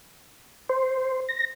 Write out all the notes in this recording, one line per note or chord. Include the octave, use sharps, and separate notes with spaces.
C5
A#6